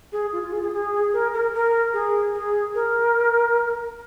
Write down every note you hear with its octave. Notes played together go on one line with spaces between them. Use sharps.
G#4
F4
F4
G#4
G#4
G#4
A#4
A#4
A#4
G#4
G#4
A#4